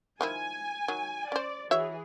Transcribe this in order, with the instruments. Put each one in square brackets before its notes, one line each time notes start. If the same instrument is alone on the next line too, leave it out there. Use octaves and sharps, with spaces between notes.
[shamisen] D#3 F3 E4 [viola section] G#5
[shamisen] D#3 F#3
[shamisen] C#4 C5 [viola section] D5
[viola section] E3 G#4 [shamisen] F#4 C#5 E5